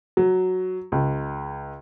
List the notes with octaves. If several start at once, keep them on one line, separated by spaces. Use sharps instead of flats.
F#3
C#2